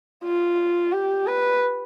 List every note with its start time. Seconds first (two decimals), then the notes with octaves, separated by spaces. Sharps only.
0.24 F4
0.92 G4
1.26 B4